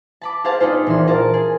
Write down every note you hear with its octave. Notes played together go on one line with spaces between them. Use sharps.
A5 B5 D6
G4 G#4 C5 F5 A5
B3 D4 D#4 F4 C5
A#1 E3 C6
F4 A#4 C5 A5
G#4